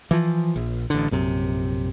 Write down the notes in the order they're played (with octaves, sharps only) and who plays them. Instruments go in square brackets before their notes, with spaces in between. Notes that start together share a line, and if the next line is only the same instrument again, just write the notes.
[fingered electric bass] E3 F3
A#1
A1 D3
A#1 F#2 C3